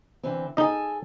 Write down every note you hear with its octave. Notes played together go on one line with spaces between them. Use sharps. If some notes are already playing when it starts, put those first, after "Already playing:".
D3 E3 C4
D#4 G#4 A4 D#5 G#5